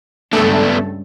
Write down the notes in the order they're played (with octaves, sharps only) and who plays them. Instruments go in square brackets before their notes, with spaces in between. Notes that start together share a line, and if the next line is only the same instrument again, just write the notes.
[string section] C#2 G2 [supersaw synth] A3 A4 [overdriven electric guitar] B3 D4